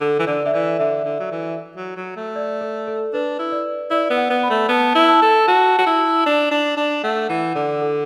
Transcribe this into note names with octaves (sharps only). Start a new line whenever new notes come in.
D3 A4
E3
D3 D5
D3 E5
E3 D5
D3 E5
D3
F#3
E3
F#3
F#3
A3
D5
A4
A4
D4 B4
E4
D5
E4 D5
B3
F#5
B3
B5
A3
B3 A5
E4
A5
A4
F#4 A5
F#4
E4
D4
D4
D4
A3 F#5
E3 F#5
D3 D5
A4